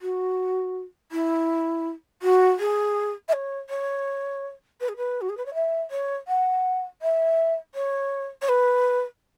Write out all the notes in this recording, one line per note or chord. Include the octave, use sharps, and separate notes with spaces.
F#4
E4
F#4
G#4
E5
C#5
C#5
B4
G#4
B4
F#4
G#4
B4
C#5
E5
C#5
F#5
E5
C#5
C#5
B4